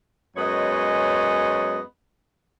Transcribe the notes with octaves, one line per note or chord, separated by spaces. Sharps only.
F#2 G#3 B3 C#5 D#5